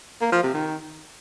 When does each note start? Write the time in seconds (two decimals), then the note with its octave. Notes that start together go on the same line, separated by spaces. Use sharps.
0.22 A#3
0.32 F3
0.43 C3
0.54 D#3